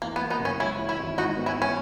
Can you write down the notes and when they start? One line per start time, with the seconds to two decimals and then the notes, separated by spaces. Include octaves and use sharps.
0.02 E2 A#3
0.16 B3
0.22 A#3
0.30 B3 D#4
0.40 F#1
0.45 C#4
0.60 G#3 C#4 E4
0.78 E3
0.89 C#4 E4
0.99 G#1
1.18 G#2 D#4 F#4
1.37 B3
1.46 C#4 E4
1.57 E3 C#4